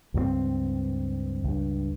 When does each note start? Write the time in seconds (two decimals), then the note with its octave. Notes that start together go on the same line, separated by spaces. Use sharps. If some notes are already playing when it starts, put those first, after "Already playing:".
0.14 C#2 G2 F3 C4
1.44 C#2 G2